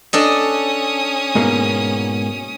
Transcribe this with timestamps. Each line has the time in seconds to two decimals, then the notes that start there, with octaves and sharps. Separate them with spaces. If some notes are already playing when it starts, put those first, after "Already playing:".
0.13 C#4 D4 A4 D#5 D#6
1.35 G#2 B2 A#3